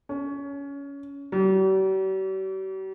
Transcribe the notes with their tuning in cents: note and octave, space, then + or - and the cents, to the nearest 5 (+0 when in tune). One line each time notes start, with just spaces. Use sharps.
C#4 +20
G3 -45